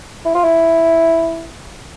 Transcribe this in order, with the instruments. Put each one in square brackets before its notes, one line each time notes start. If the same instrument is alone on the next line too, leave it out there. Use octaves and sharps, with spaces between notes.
[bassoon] E4
F4
E4